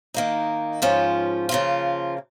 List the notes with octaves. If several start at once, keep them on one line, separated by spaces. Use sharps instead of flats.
D#3 A#3 D#4
G#2 F3 C#4 F4
C#3 F3 A#3 F4